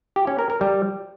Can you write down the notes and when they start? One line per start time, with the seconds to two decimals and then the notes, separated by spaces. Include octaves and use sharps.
0.16 G4
0.27 C#4
0.39 A#4
0.50 A#4
0.61 G3